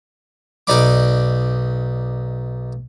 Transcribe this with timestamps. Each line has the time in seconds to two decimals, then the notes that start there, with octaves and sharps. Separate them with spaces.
0.67 B1 D#4 D5 B5 D6